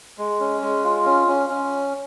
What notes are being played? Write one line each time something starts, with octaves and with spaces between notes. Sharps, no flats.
G#3
C#4
G#3
F4
C#4
C#4
C#4